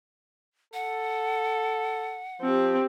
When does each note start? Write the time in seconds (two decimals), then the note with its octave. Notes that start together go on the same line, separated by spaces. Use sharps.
0.74 A4 F#5
2.42 F3 C4 G4